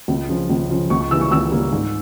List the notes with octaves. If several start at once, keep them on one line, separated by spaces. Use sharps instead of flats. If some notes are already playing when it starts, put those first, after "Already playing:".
C#2
C#3 F3
C#2
C#3 F3
C#2 C#6
C#6
C#3 E3 G3 A#3 E6
C#6
C#2 E6
C#3 E3 G3 A#3
G#2